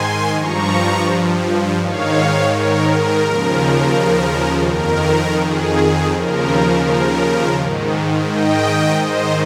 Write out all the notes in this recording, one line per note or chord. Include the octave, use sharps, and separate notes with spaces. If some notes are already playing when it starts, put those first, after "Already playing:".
Already playing: G#2 D#3 G#5 C6
G2 F3 A#5 C#6
G#2 D#3 C#5 F5
A#4 C#5
A#4
D#2 C#3 F3
F2 D#3 A#4
G#4
D#2 C#3 F3 A#4
A#4
G#2 D#3
D#5 G5
G#2 D#3 C5 D#5